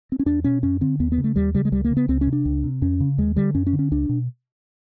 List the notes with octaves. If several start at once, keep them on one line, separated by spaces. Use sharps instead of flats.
C4
C#4
E2 D4
B2 C#4
F#2 C#4
D3 C4
D#2 B3
B3
C#3
A3
D#2 G3
C#3 G3
G#3
C#2 G3
A#3
C#3
B3
C#2 C4
C#4
C3
D4
C#2
C3
F2 C#4
C#3
D#2 G#3
D3 G3
F#2 C#4
C#4
D3
C#4
C#2 D4
B2